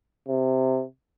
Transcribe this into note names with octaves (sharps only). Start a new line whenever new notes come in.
C3